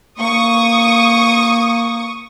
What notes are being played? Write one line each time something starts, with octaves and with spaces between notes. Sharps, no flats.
A#3 C#6 D#6